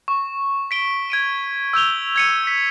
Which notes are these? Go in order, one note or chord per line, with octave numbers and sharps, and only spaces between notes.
C#6
B6 D7 G7
G#6 D7 D#7
E6 G6 F7 G7
G#6 C#7 D#7
B6